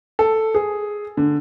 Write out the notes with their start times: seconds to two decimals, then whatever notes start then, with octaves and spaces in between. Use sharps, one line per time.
0.19 A4
0.55 G#4
1.17 D3